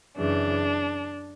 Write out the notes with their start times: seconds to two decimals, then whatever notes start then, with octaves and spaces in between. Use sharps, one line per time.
0.16 F#2 C#3 E3 D4